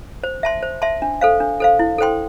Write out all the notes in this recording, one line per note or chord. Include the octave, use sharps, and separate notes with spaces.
C5
E5 A5 C6
C5
E5 A5 C6
D4
A4 C5 F5
D4
A4 C5 F5
E4
A4 C5 G5 C6